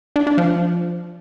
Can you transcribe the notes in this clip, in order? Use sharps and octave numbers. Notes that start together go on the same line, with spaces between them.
D4
D4
F3